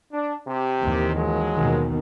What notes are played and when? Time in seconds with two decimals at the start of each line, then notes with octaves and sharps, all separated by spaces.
0.12 D4
0.47 C3 G4
0.81 D#2 D#3 E3
1.15 F3 F#3 G#3
1.55 D#2 B2 D#3